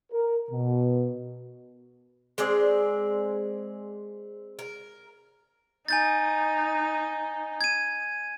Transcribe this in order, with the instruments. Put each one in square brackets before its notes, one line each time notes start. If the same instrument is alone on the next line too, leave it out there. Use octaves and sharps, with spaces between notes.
[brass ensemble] A#4
B2
[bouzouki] G#3 C4 G#4 D5
A#4
[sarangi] D#4 [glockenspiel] G#5 G6 A6
[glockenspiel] G#6 D#7